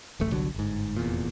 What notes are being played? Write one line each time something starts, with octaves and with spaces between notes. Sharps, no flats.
D1 A1 A3
G1 C2 D3 F#3
G1 G#2
F1 E2 A#2